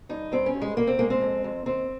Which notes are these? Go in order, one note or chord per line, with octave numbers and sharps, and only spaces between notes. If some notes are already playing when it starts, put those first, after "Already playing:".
G2 D#4
G2 C4
C#4
G2
G#3
A#2 A#3
C4
G#3 A#3
C4
F2
F2
D#2 C4